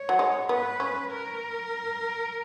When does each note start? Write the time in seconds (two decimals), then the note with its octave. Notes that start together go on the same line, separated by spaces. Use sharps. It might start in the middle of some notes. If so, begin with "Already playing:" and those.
Already playing: C#5
0.09 F#3
0.19 G#3
0.49 B3 B4
0.80 C#4
1.11 A#4